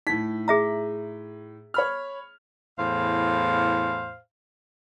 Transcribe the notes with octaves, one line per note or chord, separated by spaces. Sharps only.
A2 D#4 B6
G#4 E5 A#5
C#5 B5 F6
E2 A2 C5 F5